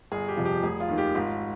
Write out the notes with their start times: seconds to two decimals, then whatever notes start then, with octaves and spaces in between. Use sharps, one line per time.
0.12 G1 G#4
0.28 G4
0.37 F2 C3 F3
0.45 G4
0.63 F1 G#4
0.80 F4
0.89 D#2 D#3
0.98 G4
1.15 G#1 F4